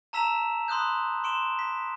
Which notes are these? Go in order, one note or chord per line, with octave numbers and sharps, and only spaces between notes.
A5 A#5 E6 B6 E7 F7
B5 C6 D#6 F#6 G6
C6 C#6 D7 E7
B6